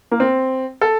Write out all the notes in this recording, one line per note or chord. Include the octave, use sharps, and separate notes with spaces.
A#3
C4
A4